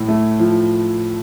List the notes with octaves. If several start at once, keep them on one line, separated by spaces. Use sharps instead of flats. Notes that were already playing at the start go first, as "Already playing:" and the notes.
Already playing: A2
A3
F3